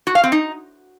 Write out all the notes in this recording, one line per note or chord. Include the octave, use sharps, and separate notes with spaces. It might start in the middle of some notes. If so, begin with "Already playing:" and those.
F#4
F5
C4
D#4